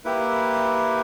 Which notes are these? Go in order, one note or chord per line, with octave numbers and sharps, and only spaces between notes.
A#3 E4 G4 B4